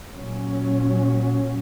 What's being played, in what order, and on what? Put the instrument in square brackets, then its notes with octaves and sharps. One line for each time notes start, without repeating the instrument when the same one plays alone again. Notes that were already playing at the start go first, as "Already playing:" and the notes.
[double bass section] A#2 F#3 C#4